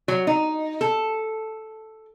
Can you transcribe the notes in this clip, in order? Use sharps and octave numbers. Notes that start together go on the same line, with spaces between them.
F#3
D#4
A4